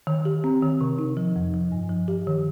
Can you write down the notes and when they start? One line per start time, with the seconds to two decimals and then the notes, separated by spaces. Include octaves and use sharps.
0.07 D#3
0.25 G4
0.44 C4
0.62 D#3
0.81 C3
0.99 D#4
1.17 F3
1.36 F2
1.54 F3
1.72 G2
1.89 F3
2.08 G4
2.27 D#3